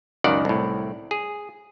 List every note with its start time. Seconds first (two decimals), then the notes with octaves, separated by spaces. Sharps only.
0.24 C#2 F#2 D#3 D5 F#5
0.45 C2 A2
1.11 G#4